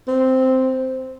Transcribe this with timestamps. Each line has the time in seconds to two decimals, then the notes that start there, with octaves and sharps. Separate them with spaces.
0.08 C4